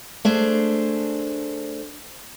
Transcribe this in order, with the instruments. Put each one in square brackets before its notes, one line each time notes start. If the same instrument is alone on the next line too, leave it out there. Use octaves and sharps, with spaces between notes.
[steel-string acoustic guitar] A3 D4 G#4 C5